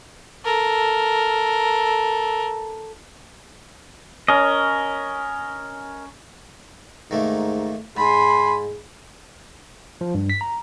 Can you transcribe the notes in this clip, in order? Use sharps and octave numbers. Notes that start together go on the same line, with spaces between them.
A4 A#4
C#4 A#4 D#5
G#2 D#3 A3 A#3
G#2 G#4 G#5 B5 C6
F3
G2
B6
A#5